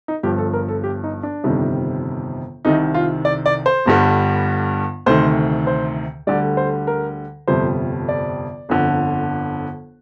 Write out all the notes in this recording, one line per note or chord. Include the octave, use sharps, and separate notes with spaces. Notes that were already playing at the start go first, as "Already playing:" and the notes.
D#4
G1 G2 F3 G4
A4
A#4
A4
G4
D#4
D4
G1 F2 C3 D#3 G3
C2 C3 D#3 D#4
F4
D5
D5
C5
G1 G2 D3 G3
D2 C3 D#3 C5
C5
D2 D3 G3 D5
C5
A#4
G1 F2 C3 G3 C5
D5
G1 F2 D3